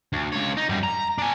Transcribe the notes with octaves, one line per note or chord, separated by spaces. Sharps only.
D2
C#2 C#5
D#4
F#2 G3
A#5
D4 G#5